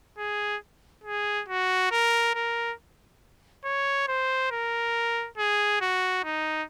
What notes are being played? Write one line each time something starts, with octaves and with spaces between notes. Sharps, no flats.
G#4
G#4
F#4
A#4
A#4
C#5
C5
A#4
G#4
F#4
D#4